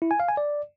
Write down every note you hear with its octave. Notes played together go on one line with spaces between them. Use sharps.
E4
G#5
F5
G#5
D5